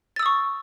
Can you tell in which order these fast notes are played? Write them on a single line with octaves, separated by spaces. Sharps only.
A6 E6 D#6 C#6